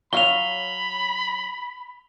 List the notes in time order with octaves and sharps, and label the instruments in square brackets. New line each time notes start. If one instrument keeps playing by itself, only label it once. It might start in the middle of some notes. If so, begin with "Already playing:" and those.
[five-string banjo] F#3 C#5 F5 [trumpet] B5 [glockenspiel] F7 G7